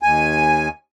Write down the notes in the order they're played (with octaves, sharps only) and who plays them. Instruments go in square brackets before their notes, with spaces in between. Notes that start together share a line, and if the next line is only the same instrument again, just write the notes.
[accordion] D#2 G#5